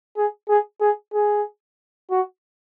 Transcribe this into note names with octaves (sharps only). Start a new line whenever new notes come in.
G#4
G#4
G#4
G#4
F#4